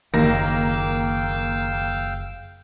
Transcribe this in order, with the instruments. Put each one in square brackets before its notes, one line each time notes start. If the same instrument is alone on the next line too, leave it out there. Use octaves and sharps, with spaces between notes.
[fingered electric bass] F#1 [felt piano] D#2 [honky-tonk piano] A#3 A#6 [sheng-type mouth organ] F5 G5 E6